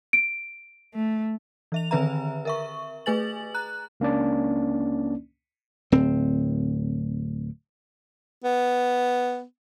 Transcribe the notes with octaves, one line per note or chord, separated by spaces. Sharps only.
D7
A3
E3 E5 F7
D3 D#3 C4 B4 E5 A#5
A#4 E5 C#6
A3 G#4 B4 G#5 A6 F#7
A#5 F#6
C#2 A#3 C#4 D4 D5
D1 C4
B3